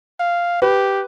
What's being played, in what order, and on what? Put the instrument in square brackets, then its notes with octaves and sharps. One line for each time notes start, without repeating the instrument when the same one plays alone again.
[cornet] F5
[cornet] G4 [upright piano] B4